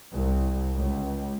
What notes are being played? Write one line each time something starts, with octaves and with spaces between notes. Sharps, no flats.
C2
C#2